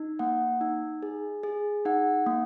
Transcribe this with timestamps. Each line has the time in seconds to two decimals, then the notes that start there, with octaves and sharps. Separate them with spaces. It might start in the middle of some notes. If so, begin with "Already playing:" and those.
Already playing: D#4
0.19 A#3 F#5
0.61 D#4
1.03 G#4
1.43 G#4
1.85 D#4 F#5
2.26 A#3